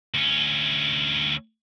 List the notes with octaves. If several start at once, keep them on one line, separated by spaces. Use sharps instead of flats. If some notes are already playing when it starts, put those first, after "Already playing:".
D2 C#4